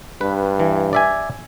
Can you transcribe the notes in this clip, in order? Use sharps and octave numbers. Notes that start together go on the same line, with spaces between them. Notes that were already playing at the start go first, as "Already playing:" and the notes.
G2 B4
E3
D5 E5 G#5